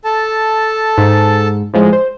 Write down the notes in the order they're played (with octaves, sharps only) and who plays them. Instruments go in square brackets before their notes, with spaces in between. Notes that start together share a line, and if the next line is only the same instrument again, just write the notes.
[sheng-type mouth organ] A4 A5
[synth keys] G#2
A2 F3 G#3
C5